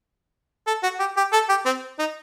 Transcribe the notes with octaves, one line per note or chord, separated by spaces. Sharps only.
A4
F#4
G4
G4
A4
G4
C4
D#4